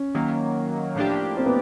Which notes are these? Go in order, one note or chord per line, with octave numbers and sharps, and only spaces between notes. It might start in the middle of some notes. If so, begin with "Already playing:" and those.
Already playing: C#4
D#3 F#3 A#3
A2 F3 A#3 D4 G4
C4
B3